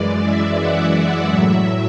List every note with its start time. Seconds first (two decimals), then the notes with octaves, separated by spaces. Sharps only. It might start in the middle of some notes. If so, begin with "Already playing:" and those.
Already playing: F#2 E3 G#3 D5
0.23 E5
0.58 F#5
0.93 F#5
1.28 A2 F#3 E5